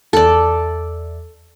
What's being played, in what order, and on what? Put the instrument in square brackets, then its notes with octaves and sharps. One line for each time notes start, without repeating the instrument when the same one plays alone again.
[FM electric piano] E2 [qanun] A4 D5